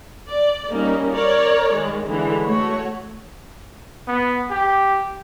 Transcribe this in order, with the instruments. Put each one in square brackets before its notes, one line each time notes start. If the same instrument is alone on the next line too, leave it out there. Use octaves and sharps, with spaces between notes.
[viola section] D5
G3 A#3 C#4 D#4
A#4 C#5 D5
D#3 G#3
D3 E3 G#3
A3 F#4 C#5
[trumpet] B3
G4